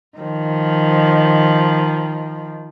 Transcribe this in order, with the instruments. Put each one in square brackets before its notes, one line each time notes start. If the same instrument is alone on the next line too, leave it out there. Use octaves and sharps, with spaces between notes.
[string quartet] D#3 F3